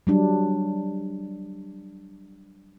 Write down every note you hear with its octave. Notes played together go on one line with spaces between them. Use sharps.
F#3 G3 D4